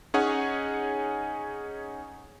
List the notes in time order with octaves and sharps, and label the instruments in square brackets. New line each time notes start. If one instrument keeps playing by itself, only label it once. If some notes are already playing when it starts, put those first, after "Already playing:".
[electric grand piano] C#4 D#4 G#4 C#5 F#5 G#5